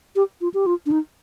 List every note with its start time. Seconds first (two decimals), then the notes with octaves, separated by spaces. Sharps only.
0.16 G4
0.41 F4
0.54 G4
0.66 F4
0.86 D4
0.91 D#4